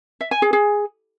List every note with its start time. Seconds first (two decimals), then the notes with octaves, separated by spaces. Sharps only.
0.21 E5
0.31 G#5
0.42 G#4
0.53 G#4